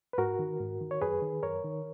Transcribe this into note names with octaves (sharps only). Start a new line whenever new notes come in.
B4
G#2 F#4 A#4
D#3
G#2
D#3
C#5
F#2 G#4 B4
D#3
F#2 A#4 C#5
D#3